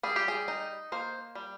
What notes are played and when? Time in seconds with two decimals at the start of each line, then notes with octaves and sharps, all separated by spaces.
0.03 G3 G#4
0.16 G4
0.28 G#4
0.48 D#4
0.92 A#3 C5
1.35 G3